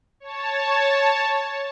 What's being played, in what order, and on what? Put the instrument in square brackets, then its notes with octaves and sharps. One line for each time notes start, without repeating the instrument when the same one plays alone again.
[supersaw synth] C#5 A5